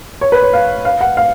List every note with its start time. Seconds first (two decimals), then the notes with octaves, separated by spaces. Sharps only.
0.21 C#5
0.32 B4
0.43 C#5
0.53 F5
0.85 F5
1.01 F#5
1.17 F5